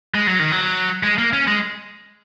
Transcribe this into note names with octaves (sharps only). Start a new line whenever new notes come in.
G#3
F#3
D#3
F#3
G#3
A#3
C#4
G#3